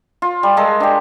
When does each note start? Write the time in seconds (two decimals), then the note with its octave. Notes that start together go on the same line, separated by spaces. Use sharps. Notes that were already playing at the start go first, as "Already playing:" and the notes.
0.22 F4
0.43 G3
0.57 G#3 A4 A#4
0.80 D4 G4